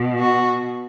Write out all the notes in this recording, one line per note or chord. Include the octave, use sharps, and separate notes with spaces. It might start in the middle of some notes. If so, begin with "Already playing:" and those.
Already playing: B2
F#4